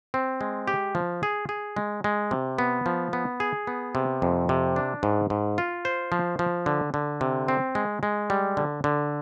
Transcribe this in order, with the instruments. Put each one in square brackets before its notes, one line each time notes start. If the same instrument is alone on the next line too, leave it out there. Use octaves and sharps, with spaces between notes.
[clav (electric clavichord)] C4
G#3
G4
F3
G#4
G#4
G#3
G#3
C3
B3
F3
B3
G#4
B3
C3
F2
C3
D4
G#2
G#2
F4
C5
F3
F3
D3
D3
C3
C4
G#3
G#3
G3
D3
D3